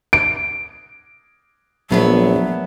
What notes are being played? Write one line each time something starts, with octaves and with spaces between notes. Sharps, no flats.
D7
A#1 F#3 A3 B3 E5